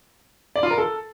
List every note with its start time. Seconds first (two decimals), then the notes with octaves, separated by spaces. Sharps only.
0.56 D5
0.63 F4
0.70 A#4
0.78 A4